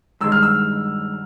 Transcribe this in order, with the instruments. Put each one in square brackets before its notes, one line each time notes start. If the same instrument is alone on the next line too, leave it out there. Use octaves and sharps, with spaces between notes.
[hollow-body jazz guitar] G2 D#3 G#3 [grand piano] E6
[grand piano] F6
E6